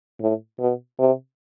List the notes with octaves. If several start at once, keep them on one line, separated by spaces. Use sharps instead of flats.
A2
B2
C3